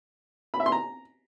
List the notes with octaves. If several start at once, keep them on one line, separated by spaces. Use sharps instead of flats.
B5
E5
C6
A#5